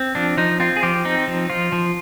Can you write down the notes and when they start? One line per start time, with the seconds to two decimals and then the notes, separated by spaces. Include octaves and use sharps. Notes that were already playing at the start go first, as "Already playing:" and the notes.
Already playing: C4
0.15 F3 D4
0.38 F3 D#4
0.60 C4 F4
0.76 G#4
0.83 F3 G4
1.05 C4 D#4
1.27 F3
1.50 F3 F4
1.72 F3